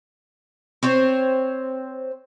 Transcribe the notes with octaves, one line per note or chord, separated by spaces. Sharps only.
C4 C5 C#5